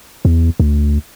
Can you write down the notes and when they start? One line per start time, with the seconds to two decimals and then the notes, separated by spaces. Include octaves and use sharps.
0.25 E2
0.60 D2